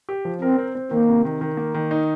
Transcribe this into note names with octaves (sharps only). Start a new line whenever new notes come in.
G4
F3
C4 A#4
C4
C4
D#3 A#3
C3
D#3
D#3
A#3
D#3
D#4